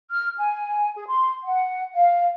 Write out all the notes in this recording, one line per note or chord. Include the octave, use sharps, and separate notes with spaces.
F6
G#5
G#4
C6
F#5
F5